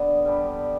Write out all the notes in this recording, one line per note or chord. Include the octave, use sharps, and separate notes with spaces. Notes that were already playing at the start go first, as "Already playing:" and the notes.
Already playing: D3 B3
G3 B3 D4 G4